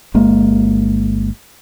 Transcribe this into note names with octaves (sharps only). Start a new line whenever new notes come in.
G1 G#3 A#3